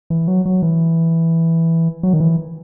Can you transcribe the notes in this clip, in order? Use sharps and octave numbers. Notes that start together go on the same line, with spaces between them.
E3
F#3
F#3
E3
F#3
D#3
E3